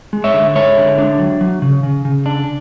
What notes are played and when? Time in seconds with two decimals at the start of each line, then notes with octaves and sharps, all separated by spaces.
0.13 G#3
0.24 C#5 E5
0.34 D3
0.55 G#3 C#5 E5
0.77 D3
0.98 D4
1.19 F#3
1.41 F#3
1.62 C#3
1.83 C#3
2.05 C#3
2.26 D4